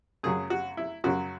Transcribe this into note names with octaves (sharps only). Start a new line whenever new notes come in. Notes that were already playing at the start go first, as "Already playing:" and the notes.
F#2 C#3 F#3 G#4
F#4
E4
F#2 C#3 F#3 F#4